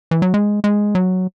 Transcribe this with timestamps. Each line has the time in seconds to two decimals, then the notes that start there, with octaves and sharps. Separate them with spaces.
0.11 E3
0.22 F#3
0.34 G#3
0.64 G#3
0.95 F#3